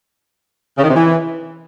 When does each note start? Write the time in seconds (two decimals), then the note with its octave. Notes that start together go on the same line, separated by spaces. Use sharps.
0.77 C#3
0.83 D#3
0.89 C3
0.95 E3